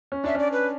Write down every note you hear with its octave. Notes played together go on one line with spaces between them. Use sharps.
C#4
D4 E5
C#4 D5
B4